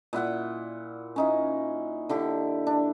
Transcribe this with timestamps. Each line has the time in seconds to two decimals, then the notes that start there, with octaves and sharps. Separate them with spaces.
0.13 A#2 E4 F#5 G5
1.16 C#4 D#4 E4
2.09 D3 E4 G4
2.67 D4